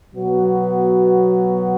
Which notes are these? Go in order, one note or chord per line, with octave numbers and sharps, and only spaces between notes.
B2 F#3 B3 F#4